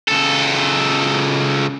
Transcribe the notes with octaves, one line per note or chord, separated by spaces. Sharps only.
C#2 A4